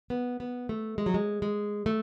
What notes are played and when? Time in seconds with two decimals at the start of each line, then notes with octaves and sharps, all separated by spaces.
0.10 B3
0.40 B3
0.69 A3
0.98 G#3
1.06 F#3
1.14 G#3
1.42 G#3
1.86 A3